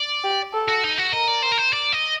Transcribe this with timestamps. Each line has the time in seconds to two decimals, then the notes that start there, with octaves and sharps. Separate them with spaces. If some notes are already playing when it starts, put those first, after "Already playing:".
Already playing: D5
0.24 G4
0.54 A4
0.68 F#4
0.84 D#4
0.98 F#4
1.13 A#4 D#5
1.28 D5
1.42 C5
1.52 A#4
1.58 C5
1.73 D5
1.92 D#5